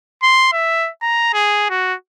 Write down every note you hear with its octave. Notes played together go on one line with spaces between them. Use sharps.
C6
E5
A#5
G#4
F#4